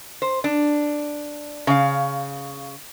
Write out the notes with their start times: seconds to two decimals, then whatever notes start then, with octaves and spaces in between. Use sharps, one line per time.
0.22 C5
0.44 D4
1.67 C#3 F5